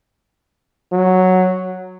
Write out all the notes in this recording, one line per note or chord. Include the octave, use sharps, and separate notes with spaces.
F#3